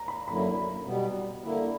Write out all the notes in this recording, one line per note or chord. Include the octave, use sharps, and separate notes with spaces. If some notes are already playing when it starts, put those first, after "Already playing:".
Already playing: A#5
B5
F#2 D3 F#3 A#3 E4 B5
B2 G3 B3
D3 A#3 E4